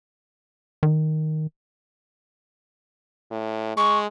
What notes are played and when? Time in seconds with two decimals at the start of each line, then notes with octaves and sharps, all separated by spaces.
0.83 D#3
3.31 A2
3.77 G#3 C#6